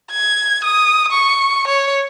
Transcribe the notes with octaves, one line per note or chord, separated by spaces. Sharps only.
G#6
D#6
C#6
C#5